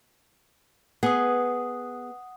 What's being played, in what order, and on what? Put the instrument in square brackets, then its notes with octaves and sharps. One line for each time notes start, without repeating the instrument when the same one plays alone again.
[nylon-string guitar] B3 G#4 [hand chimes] F#5 D#6